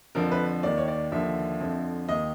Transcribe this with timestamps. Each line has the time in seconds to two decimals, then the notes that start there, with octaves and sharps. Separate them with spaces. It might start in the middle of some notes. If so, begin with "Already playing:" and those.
0.15 F2 D3 F3 A#4
0.32 B4
0.63 D#2 D#3 D5
0.78 C#5
0.88 D5
1.12 D#2 D3 F3 E5
1.60 F2 D3 F3
2.09 D#2 D#3 D#5